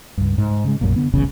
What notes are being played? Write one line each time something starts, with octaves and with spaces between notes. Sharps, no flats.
C#2 G2
G#2
C#3 G#3
B1 F#2 A#2
D3 B3
F1 B1 E2 C#3